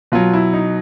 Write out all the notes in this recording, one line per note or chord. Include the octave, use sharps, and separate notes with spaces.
B2 F#3 F4
E4
D#4